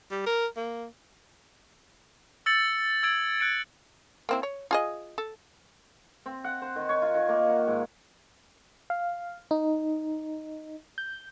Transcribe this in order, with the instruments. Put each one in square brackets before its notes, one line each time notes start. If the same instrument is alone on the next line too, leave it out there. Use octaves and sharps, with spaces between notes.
[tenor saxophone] G3
A#4
A#3
[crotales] E6 G6 A6 C#7 F#7
E6 G#6 D7 F#7
F#6 G#6 C#7 D7
[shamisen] A#3 C4 E4
C#5
F4 G#4 D#5
A4
[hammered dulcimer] C4
F#5
C5
D#3
C#5
F4
D#3
A#3
F#5
G#2
[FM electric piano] F5
D#4
G6